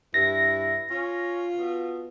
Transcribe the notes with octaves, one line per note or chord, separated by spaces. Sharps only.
G2 E4 A#6
C#4 F4
B2